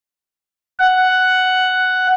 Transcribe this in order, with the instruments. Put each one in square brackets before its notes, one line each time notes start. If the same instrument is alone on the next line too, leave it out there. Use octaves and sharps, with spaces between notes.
[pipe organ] F#5